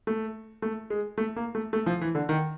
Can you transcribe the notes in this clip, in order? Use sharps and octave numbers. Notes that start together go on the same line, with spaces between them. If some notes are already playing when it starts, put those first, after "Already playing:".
A3
A3
G#3
A3
A#3
A3
A3
F3
E3
D3
D#3